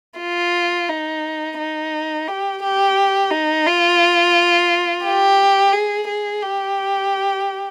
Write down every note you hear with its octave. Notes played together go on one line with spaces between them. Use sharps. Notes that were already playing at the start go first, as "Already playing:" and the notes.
F4
D#4
D#4
G4
G4
D#4
F4
G4
G#4
G#4
G4